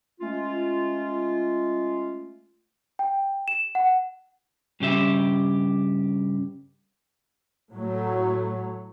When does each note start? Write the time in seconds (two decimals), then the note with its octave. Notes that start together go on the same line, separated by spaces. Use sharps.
0.21 G#3 A3 C#4 F4
2.99 G5
3.48 E7
3.75 F#5
4.80 G2 C#3 G4 E5
7.71 A2 F#3 A3